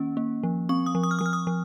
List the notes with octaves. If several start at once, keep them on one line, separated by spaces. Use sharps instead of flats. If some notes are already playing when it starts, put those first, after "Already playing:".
Already playing: D#3 A#3 C#4
A#3
F3
C4 C#6
D#6
F3
D#6
F6
F3 D#6
F6
D#6
F3